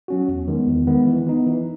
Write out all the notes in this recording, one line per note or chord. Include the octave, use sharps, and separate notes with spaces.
F#3 C#4 F#4
E2
D#3 G#3 B3
E2
D#3 G#3 B3
E3
B3 D#4
E3